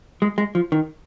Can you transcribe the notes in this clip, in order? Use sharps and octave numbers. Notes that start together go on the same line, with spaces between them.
G#3
G#3
F3
D#3